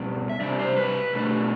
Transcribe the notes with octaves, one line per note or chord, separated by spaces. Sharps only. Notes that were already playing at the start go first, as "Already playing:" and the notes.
Already playing: B2 G3 B3 D5
E5
C3 G3 D4 D5
C5
B4
B2 A3 D4